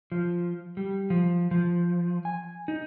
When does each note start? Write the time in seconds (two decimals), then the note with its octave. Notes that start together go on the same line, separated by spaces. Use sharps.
0.12 F3
0.77 G3
1.10 F3
1.51 F3
2.25 G#5
2.68 D#4